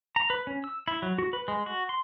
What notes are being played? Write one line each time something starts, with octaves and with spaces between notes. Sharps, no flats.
A#5
B4
C#4
E6
E4
F#3
F#4
B4
G#3
F#4
C6